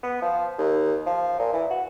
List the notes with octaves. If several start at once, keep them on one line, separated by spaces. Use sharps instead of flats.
B3
F3
D#2
F3
A#2
E3
F#4